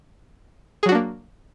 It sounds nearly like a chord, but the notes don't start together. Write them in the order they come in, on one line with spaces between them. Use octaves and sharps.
G#4 F#3 F#4 D4 A#3